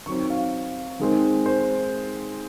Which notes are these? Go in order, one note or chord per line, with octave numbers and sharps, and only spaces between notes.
D#3 F#3 C4 C#6
F5
D#3 G#3 C4
C5